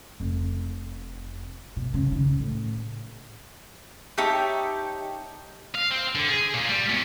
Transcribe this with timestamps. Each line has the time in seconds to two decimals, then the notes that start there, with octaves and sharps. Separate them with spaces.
0.20 F1
1.76 B2
1.94 C#3
2.12 D#3
2.39 A2
4.18 D#4 G4 C#5 E5 A5
5.75 F5
5.91 C4
6.15 D3
6.29 G#4
6.54 A#2
6.68 G3
6.89 E2